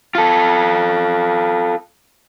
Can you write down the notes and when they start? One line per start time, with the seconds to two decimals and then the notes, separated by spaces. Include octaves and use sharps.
0.15 F4 A4